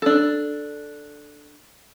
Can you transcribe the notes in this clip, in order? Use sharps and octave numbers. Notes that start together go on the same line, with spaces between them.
D4 A4